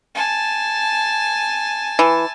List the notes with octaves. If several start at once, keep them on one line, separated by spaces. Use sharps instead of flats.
G#5 A5
E3